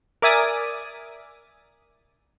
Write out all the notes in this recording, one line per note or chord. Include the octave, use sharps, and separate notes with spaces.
A#4 D5 E5 G#5 D6 D#6